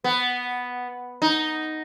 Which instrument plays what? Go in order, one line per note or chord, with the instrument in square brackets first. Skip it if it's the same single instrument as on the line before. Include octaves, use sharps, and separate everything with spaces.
[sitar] B3
D#4